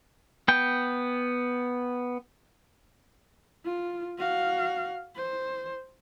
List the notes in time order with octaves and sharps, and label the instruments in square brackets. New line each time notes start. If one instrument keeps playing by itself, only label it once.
[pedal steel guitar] B3 G5
[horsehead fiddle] F4
F#4 F5
C5